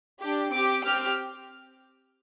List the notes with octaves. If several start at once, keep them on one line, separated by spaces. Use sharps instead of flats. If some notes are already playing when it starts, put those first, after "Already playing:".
D4 G4
C4 G4 D6
C4 G4 F6